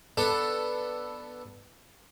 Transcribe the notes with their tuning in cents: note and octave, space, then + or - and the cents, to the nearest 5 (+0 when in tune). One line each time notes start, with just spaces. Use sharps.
B3 +0 D4 +10 A4 +0